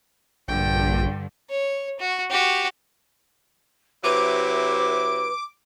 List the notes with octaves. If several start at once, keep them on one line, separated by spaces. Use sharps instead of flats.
A#1 G2 D3 G5
C#5
F#4
F#4 G4
C3 F#3 E4 B4 D6